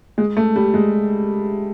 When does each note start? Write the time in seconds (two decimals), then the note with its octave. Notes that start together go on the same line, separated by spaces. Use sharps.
0.18 G#3
0.37 A3
0.56 G3
0.74 G#3